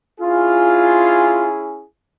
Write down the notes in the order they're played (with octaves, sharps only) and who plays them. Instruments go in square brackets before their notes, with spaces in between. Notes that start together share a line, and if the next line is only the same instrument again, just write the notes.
[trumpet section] C#4 E4 G#4 [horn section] F4